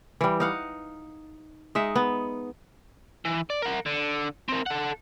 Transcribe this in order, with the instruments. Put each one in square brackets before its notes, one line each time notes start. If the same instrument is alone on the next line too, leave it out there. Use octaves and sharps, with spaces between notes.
[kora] E3 G3
D#4 F5 F#5
G#3 D#4 E5
B3
[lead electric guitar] E3
D5
A#4 F#5
D3
C4 A#4
A4 F#5